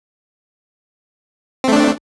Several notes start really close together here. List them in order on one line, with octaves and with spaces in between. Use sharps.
C4 A3 D4